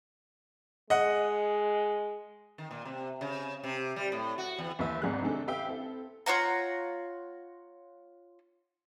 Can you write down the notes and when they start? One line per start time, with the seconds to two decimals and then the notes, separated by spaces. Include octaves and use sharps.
0.90 G#3 D#5 F#5
2.58 D#3
2.71 A#2
2.85 C3
3.21 C#3
3.64 C3
3.96 G3
4.12 A2
4.38 F#4
4.58 E2
4.79 D#2 E3 B4 E5 B5
5.02 G#1 G#2 C3 C4 G#4 F#6
5.22 C3 D#3 G#3 D4 A4
5.47 G4 B4 E5 F5 G5
5.66 C4 E4 A4
6.26 F4 C#5 F#5 A#5